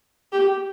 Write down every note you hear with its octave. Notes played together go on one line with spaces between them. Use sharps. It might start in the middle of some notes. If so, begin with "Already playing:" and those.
G4